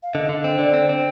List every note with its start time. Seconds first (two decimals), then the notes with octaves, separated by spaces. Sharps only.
0.03 F5
0.14 D3 D#5
0.29 D3
0.44 C4
0.58 D3 D5
0.74 C4
0.89 C4